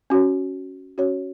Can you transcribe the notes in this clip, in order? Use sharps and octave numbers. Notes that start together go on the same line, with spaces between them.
C#4 F#4 C#5
C#4 F#4 C#5